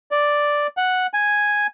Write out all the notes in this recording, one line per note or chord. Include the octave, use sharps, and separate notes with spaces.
D5
F#5
G#5